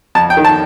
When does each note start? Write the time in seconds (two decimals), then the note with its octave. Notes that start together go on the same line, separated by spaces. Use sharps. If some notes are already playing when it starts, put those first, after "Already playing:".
0.15 F2 A5
0.30 G5
0.37 D#3
0.45 A5